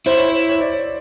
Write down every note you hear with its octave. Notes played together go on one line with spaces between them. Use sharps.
E4 C5
C#5
C5
C#5
D5
C#5